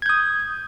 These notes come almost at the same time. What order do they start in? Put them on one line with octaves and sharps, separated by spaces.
G#6 G6 D#6